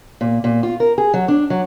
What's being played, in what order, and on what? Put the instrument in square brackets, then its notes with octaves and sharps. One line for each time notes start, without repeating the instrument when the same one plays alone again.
[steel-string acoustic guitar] A#2
A#2
F4
A#4
G#4
F#3
D4
F#3